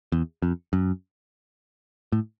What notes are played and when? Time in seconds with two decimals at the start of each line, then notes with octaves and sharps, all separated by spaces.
0.12 E2
0.42 F2
0.73 F#2
2.12 A2